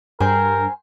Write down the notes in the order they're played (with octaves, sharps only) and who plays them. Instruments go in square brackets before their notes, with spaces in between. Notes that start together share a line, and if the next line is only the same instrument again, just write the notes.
[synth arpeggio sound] G2 [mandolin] G#4 C5 G5 [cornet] A#4